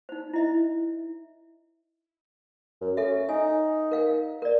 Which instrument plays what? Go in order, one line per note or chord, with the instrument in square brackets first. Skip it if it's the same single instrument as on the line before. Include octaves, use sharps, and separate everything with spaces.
[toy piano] D#4 C5
E4 D#5 E5
[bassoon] F#2
[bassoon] C#4 [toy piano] A4 E5
[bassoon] D#4 [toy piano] G#5
[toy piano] A#4 F5 G5
A#4 D5